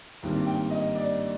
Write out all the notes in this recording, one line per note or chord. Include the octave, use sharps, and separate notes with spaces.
G#1 G2 D#3 G3 A#3
G5
D#5
D5